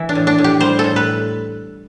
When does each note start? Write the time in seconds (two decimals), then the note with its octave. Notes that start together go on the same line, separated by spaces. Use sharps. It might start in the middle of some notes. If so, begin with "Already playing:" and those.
Already playing: E3 E4
0.09 D4
0.15 A2
0.27 D4
0.38 A2
0.44 G4
0.60 G3 C5
0.79 A4
0.84 A2
0.96 B4